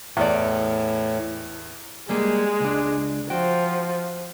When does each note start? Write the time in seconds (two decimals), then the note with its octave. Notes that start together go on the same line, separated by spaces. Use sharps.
0.17 E2 A2 D5
2.09 G3 G#3 A#3 G#4
2.60 C#2 D4
3.30 F3 F#4 G5